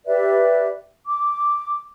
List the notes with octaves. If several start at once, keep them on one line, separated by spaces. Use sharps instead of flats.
G4 B4 D5 E5
D6